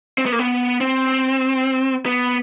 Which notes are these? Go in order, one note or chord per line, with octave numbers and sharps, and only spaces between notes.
C4
B3
A#3
B3
C4
B3